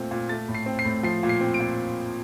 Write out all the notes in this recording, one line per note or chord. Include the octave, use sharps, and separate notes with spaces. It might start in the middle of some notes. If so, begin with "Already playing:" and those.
Already playing: A#2 A3 C4
A#2
A3 A6
A2
C7
C4
C7
A2
F3 C7
A#2
C7
C4
D7
A#2